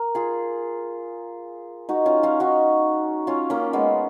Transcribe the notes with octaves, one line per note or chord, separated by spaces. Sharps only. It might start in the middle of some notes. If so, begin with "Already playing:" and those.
Already playing: A#4
F4 G#4
D#4 F#4
C#4 F4
C#4 F4
D#4 F#4
C#4 F4
A#3 C#4
G#3 B3